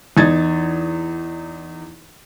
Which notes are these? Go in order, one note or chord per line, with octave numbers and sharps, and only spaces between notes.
E2 D#4 G#6 A6